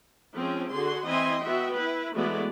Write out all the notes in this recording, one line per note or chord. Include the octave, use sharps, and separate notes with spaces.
F3 G#3 C4 C#4
D3 F#4 G#4 C6
E3 C4 D#5 E5 G#5 C6
B3 F#4 E5 G5
E4 B4
E3 G#3 A3 B3 F#4 D5